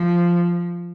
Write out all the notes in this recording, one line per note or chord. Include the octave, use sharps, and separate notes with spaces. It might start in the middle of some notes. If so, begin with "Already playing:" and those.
Already playing: F3